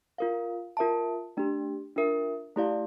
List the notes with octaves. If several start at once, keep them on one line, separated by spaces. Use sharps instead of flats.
F4 A#4 F5
F4 A#4 E5 A5
A3 D4 G4
D4 F4 A#4 E5
A3 E4 G4 D5 F5